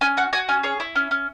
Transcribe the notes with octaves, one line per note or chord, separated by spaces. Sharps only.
C#4 G#5
F#4 F#5
F#4 G#5
C#4 G#5
G#4 C#5
E4
C#4
C#4